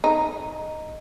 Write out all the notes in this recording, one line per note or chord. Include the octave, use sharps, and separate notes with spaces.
D#4